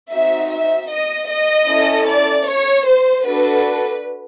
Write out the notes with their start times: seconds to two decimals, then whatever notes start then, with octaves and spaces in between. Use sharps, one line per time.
0.12 C4 D#4 F#4 E5
0.51 E5
0.91 D#5
1.29 D#5
1.69 C#4 E4 A4
2.08 D5
2.48 C#5
2.87 C5
3.26 D4 F#4 A4 B4